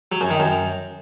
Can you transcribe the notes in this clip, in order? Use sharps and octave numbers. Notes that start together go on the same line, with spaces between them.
F#3
F#2
D#3
F#2